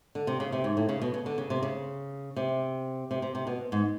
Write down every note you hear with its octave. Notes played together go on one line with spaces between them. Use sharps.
D3
C3
C#3
C3
G#2
A2
C#3
B2
C#3
D3
C#3
C3
C#3
C3
C3
C3
C3
B2
G#2